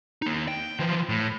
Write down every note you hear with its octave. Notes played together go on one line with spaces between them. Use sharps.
A#3 D#4
G5
E3 F3
A2